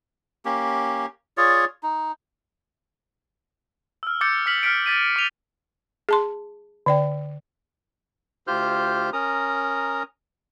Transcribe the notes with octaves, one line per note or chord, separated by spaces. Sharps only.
A#3 C#4 G4
F4 G#4 C#5 D5
D#4
E6 F6
D6 E6 G6 A6 C#7
F6 B6 F#7
E6 F6 B6 C#7 D7
A6 B6 D#7
D6 D#7 F7 G7
G#4 A5 C6
D3 D5 G5
D2 F4 G4 C5 F6 G6
C#4 A#4 A#5 D#6